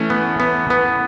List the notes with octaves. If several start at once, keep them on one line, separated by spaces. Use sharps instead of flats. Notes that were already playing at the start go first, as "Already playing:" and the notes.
Already playing: E3 A3 C#4
B3
B3
B3